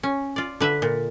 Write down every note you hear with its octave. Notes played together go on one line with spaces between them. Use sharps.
C#4
F4 D5
D3 B4 E5
A#2